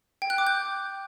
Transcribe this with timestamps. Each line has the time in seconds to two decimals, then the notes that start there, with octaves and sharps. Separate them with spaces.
0.22 G5
0.30 F#6
0.38 D6
0.47 G6